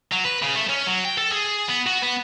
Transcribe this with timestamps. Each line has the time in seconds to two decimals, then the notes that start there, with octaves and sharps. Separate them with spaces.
0.12 F#3
0.25 B4
0.42 C#3
0.55 A3
0.69 C#4
0.87 F#3
1.04 G5
1.18 A4
1.32 G#4
1.68 B3
1.86 F#4
2.02 B3